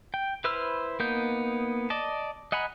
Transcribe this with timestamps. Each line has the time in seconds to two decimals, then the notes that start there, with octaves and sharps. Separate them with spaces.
0.14 G5
0.44 E4 B4 C5 E6 F6
1.00 A#3 B3 D#4 G6
1.90 D5 D#5 A5
2.52 D#5 F#5 G#5 A#5 B5